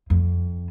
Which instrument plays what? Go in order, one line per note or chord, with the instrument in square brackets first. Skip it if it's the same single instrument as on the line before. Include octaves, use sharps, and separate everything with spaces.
[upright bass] F2